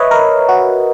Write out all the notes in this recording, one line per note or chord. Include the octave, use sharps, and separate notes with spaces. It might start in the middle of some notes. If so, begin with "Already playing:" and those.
Already playing: B4 C#5 D#5 E5
A#4
F#4